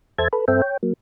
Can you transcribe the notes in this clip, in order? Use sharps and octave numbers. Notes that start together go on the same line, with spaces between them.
E2 A4 C5 E5 A5 G#6
A4 B4
G2 C4 A4 C5 E5 G5
C#5 G5
F#3 A#3